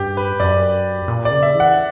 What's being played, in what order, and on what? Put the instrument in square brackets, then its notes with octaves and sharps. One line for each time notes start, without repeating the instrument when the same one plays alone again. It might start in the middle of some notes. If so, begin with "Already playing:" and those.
Already playing: [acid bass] G2 [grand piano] G4
[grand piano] B4
[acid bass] F#2 [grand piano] D5
[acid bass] A#2
[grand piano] D5
[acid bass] C#3
[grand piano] E5
[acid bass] E3
[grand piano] F#5